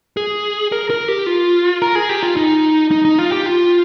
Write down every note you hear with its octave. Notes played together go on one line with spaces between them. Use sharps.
G#4
A#4
A#4
G4
F4
A#4
G#4
G4
F4
D#4
D#4
D#4
F4
G4
F4